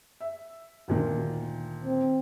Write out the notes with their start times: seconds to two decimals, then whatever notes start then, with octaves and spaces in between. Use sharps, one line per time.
0.21 E5
0.88 D2 A#2 D#3
1.84 C4